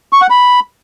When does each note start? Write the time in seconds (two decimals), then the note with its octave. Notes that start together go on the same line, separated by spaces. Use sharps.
0.13 C#6
0.21 F#5
0.30 B5